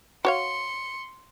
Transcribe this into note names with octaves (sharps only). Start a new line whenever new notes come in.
F#4 C#5 F5 C6 C#7